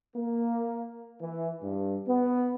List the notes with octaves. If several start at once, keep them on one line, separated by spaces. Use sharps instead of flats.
A#3
E3
G2
B3